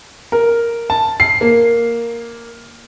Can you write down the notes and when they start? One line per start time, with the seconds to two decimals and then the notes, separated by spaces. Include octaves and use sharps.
0.32 A#4
0.90 A5
1.20 C7
1.41 A#3